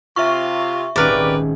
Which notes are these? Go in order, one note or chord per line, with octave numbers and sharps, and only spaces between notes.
C3 F4 E5 C#6
D#1 G#1 C#4 G4 A#4 B4 D5